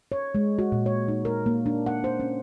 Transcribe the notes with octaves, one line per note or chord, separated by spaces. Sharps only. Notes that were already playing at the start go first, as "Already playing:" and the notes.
C#5
G#3
F#4
A#2
C#5
D#4
A#4
A#3
D4
F#5
C5
C#4